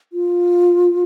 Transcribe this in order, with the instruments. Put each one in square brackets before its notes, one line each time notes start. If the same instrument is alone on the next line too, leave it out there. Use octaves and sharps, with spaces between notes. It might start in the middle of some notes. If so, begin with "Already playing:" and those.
[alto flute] F4